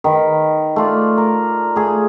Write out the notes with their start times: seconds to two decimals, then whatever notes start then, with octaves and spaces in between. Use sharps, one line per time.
0.04 D#3 B4
0.76 A3 F4 D5
1.18 A#4
1.76 A3 G#4